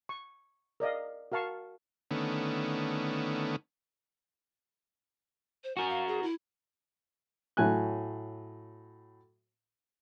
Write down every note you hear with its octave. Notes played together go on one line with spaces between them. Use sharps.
C#6
A#4 D5 D#5 F5
F#4 A#4 F5 A5 C#6
D3 D#3 A3 B3 C#4
C5
F#4 A#4 G#5
F5
G#4
E4
A2 F#3 G#5 F#6